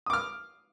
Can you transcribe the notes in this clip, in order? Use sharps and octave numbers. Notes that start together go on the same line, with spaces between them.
D6 D#6 F6